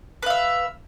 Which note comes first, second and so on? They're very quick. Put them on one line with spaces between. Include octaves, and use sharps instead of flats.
B4 F5 E5